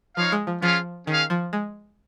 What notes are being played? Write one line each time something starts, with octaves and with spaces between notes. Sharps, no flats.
F3 D#4 C#5 F5
G#3
F3
F3 C#4 F4 G#4 F5
D#3 C#4 G#4 F5
F3
G#3